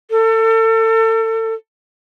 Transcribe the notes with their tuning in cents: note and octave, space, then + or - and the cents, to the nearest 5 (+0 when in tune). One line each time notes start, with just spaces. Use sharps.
A4 +35